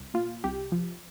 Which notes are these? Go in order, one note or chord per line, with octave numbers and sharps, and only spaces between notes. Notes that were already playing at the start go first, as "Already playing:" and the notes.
Already playing: C2
A#2 F4
C2 G4
F3